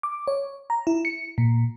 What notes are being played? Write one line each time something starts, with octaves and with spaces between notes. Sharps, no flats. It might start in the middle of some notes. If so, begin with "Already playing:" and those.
D6
C#5
A#5
E4
C#7
A#2